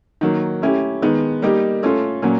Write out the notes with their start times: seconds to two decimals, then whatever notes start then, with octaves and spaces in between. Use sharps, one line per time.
0.21 D#3 F#3 A#3
0.62 A3 C#4 E4 G4
1.02 D#3 G#3 B3
1.42 G3 A#3 D#4 G4
1.83 A3 C#4 F4 A4
2.22 A#2 F#3 A#3 C#4